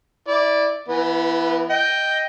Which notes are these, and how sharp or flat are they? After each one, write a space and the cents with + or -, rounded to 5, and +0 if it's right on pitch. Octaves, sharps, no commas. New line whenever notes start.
E4 -20 D5 +0
E3 +20 B3 -15
D#5 +0 G5 +0